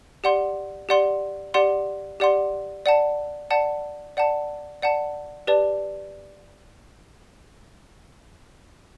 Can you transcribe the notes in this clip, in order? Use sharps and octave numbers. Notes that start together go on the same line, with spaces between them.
G4 D5 F#5 C6
G4 D5 F#5 C6
G4 D5 F#5 C6
G4 D5 F#5 C6
D5 F#5 A5
D5 F#5 A5
D5 F#5 A5
D5 F#5 A5
G4 B4 D5 A5